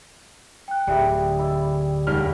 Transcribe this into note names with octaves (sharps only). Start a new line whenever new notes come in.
G5 F#6
D1 D3 G3 E4 G#4 E5 G5
E4 D5
E1 G3 F6